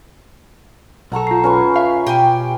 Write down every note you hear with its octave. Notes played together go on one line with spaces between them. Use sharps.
B1 A4 F#5 A#5 C#6
F4 C7
C#4 B4 C#6
E5 F5
B2 G4 G#5